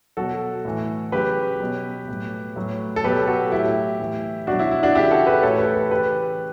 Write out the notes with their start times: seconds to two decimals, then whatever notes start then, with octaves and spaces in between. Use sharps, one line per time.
0.17 B2 F#3 F#4 A4
0.65 A2 E3
1.12 C#3 F#3 G4 B4
1.60 B2 F#3
2.08 A2 F#3
2.56 A2 F#3
2.96 A4
3.04 B2 F#3 G4 B4
3.28 F#4 A4
3.52 A2 F#3 E4 G4
3.99 A2 E3
4.47 B2 F#3 D4 F#4
4.59 E4
4.71 E4
4.83 D4 F#4
4.95 C#3 E3 E4 G4
5.11 F#4 A4
5.27 G4 B4
5.43 A2 E3 A4 C#5
5.59 G4 B4
5.75 G4 B4
5.91 C#3 E3 G4 B4